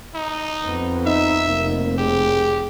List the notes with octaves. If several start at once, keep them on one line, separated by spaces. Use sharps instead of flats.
D#4
F2 B3
D#4 E5
F1 A#3
G4 G#4